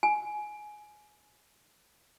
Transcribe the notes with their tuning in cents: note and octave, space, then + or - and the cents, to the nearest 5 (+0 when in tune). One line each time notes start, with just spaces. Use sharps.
G#5 +15